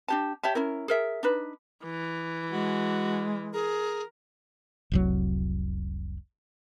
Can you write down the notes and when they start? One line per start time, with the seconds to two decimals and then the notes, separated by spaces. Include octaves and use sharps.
0.08 D4 G4 A5
0.43 G4 C#5 E5 A5
0.55 C#4 E4 A#4
0.88 G#4 A#4 E5
1.23 D4 D#4 B4
1.84 E3
2.52 G#3 F#4
3.53 G#4 A#4
4.92 F1 C2 F#3